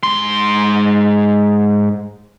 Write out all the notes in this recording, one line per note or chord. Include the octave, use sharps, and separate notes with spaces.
G#2 C6